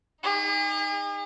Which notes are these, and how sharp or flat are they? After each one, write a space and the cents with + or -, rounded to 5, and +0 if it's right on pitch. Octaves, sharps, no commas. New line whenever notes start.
D#4 +0 G#4 -45